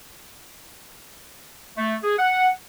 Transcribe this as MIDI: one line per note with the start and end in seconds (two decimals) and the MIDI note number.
1.77 1.95 57
2.03 2.17 68
2.18 2.48 78